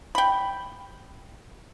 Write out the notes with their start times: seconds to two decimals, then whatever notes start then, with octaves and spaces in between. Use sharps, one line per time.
0.15 G5 B5